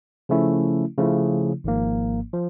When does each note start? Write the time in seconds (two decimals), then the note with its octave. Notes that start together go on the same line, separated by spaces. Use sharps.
0.29 C#3 F3 A3 C#4 E4
0.98 C#3 F3 A3 C#4 E4
1.64 G#1 G#2 F3 A#3
2.33 F3